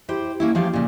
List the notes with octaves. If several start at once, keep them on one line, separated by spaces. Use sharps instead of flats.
E4 G4 C5
A#3 C#4 E4
F3 A3 G4 C#5 F5
A#2 C#3